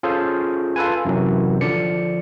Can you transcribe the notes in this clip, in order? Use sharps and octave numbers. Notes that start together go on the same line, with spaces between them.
C#4 F4 G#4 A4 C5
F4 A4 B4 G#5
F#2 C3 E3 F#3
D3 F3 D5 C#7